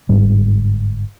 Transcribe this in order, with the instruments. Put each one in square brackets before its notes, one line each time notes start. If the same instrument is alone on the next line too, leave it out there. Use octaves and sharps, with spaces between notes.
[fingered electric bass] G1 G#2 G3